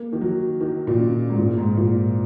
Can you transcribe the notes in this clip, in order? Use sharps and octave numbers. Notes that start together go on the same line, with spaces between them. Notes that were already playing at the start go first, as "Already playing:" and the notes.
Already playing: A#3
D#3
F#3
D#3
A#2
C#3
G#2
A#2
G#2
A#2